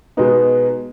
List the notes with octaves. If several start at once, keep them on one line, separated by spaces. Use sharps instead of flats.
B2 G#3 B3 D#4